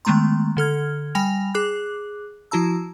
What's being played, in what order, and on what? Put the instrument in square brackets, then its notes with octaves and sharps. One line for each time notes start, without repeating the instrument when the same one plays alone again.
[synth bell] D#3 G#3 A3 B3 A#5 C6
D3 A4 F6 G#6
G3 G5 G#5 B5 A#6 F7
G#4 D6 F#6
F3 E4 F#4 A5 A#5 E6